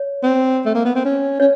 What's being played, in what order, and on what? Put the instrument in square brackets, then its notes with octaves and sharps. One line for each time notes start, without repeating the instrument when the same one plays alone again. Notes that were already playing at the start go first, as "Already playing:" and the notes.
Already playing: [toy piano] C#5
[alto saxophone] C4
A3
A#3
B3
C4
C#4
[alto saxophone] C#4 [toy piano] C#5